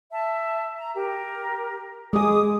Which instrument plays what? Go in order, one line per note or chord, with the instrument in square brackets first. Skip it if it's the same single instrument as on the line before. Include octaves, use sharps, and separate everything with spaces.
[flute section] E5 A5
A#5
G4 A#4
[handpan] G#3 G#4 [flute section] D6 D#6